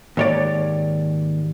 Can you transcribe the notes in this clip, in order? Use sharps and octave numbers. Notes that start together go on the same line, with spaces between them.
D#2 G#2 C#5 D5